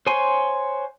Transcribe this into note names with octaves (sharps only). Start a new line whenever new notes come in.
C5 C#5 F#5 G#5 C6